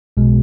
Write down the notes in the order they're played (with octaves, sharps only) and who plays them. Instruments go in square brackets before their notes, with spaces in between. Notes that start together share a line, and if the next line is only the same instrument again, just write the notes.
[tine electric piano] B1 B2 G#3